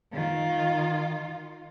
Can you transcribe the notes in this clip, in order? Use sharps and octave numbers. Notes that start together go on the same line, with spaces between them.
D#3 F4